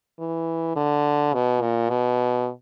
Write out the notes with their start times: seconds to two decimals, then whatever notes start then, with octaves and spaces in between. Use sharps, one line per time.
0.19 E3
0.76 D3
1.34 B2
1.61 A#2
1.89 B2